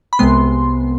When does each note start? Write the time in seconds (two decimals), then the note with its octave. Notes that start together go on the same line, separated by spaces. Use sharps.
0.13 B5
0.19 C2 C3 G#3 B3 C6